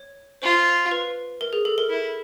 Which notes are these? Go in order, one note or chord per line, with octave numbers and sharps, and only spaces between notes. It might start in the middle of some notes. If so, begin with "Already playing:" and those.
Already playing: C#5
F4 C5
B4
A#4
G#4
A4
A#4
E4